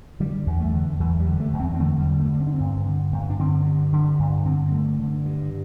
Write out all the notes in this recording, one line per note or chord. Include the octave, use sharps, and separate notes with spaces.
D3 G3
E2
A3
D3
E2 E3
G3
D3
A3
E2
C4
C4
D3 A3
G3
G2
A3
D3
C4
D4
C4
G2
D3
G2
D4
D3 C4
G2
D3
G2
D3 C4
C4
G2 A3
D3
G2